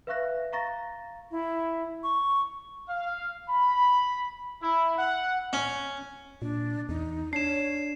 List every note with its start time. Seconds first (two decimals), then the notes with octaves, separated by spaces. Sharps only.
0.07 B4 E5 F5 C#6 F#6 A#6
0.53 F5 A#5 C#6 A6 A#6
1.31 E4
2.03 C#6
2.90 F5
3.49 B5
4.62 E4
4.98 F#5
5.53 C#4
6.42 A#2 D4
6.89 E2 D#4
7.33 D4 C#5 C7 E7